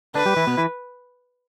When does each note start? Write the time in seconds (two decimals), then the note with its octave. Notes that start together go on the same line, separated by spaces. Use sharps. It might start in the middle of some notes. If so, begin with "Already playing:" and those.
0.15 D3 D4 B4
0.26 G3 G4
0.36 E3 E4
0.47 B2 B3
0.57 E3 E4